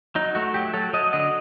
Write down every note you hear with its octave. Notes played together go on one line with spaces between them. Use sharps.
F#3 D#4
A3 F#4
F#3 G4
F#3 A4
F#3 D#5
D3 D#5